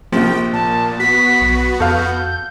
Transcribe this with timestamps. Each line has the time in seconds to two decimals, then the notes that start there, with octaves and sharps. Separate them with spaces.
0.12 A#1 C3 F3 A#3 G5
0.53 A#2 A5
1.00 B3 F#4 B6
1.41 B1
1.80 F2 A4 F5 G6